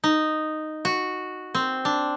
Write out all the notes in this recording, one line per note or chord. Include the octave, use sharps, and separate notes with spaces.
D#4
F#4
C4
D4